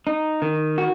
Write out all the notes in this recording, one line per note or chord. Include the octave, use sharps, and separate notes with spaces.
D#4
D#3
F#4